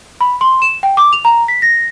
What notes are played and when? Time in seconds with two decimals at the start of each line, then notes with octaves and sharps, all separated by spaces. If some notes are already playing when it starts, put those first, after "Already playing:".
0.21 B5
0.41 C6
0.62 E7
0.83 G5
0.97 D6
1.13 F7
1.25 A#5
1.48 B6
1.62 A#6